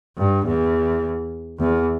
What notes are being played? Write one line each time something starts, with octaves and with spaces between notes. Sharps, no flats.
G2
E2
E2